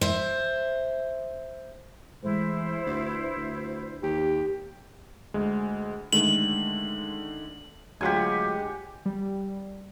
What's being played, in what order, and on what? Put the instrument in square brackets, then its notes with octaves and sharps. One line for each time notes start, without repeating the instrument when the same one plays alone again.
[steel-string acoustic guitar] C5 E5
[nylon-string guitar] E3 G#3 A3 [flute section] E4 C5
[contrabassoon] D2 [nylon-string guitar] F4 B4
[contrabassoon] D2
[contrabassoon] D#2 [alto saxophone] G4
[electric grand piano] D2 G#3
[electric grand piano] D3 D#3 A3 [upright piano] G#3 [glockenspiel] F#7
[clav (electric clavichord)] D2 F#3 F4 [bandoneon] G#3 [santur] G4 F#5 G#5
[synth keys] G3